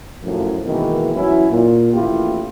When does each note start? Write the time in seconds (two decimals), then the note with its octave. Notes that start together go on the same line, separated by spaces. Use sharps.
0.22 F#2 A2 F3
0.64 B2 D#3 E3 G#3 A#3
1.14 E3 F#3 C#4 E4
1.49 A#2
1.92 A1 D#2 E4 F4 G4